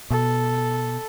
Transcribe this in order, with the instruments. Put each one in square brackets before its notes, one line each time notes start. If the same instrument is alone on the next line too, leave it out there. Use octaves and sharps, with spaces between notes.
[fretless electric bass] B2 [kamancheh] A4